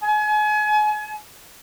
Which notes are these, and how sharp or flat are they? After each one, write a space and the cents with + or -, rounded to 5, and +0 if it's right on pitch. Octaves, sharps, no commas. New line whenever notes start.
G#5 +35